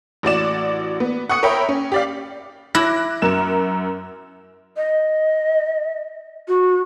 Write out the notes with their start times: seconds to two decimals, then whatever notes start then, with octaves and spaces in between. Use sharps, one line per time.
0.23 A1 F#4 D5 E7
1.00 B3
1.29 F#5 C#6 D#6 C#7
1.43 A#4 C#5 E5 G5 B5
1.69 C#4
1.92 G4 D5 F5
2.75 E4 D6 F#6 A#6
3.22 F#2 A#4 E7
4.77 D#5
6.48 F#4